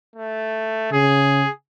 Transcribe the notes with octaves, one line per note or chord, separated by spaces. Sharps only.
A3
C#3 G#4